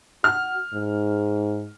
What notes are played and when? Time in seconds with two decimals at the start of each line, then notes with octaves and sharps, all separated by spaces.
0.24 F#4 F6
0.73 G#2